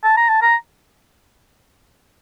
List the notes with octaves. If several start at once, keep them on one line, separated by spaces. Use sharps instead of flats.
A5
A#5
A5
A#5